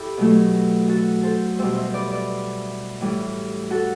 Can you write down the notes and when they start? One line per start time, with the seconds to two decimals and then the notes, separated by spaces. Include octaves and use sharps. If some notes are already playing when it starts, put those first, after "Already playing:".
Already playing: E4 G4 A4
0.18 B2 F#3 A3
0.88 F#4 A4
1.23 A4 C5
1.59 B2 G3 C5 E5
1.76 C5 E5
1.94 B4 D5
2.11 B4 D5
3.01 A2 E3 G3
3.70 F#4 A4